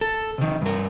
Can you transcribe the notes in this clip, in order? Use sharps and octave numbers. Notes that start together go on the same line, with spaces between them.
A4
C3 D#3
G2 A#4